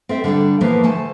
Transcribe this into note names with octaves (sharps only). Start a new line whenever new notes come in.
C4 A4 E5
D3 G3 D4 A4
A#2 E3 F3 A#3 B3
D2 A3 C5 G#5 A5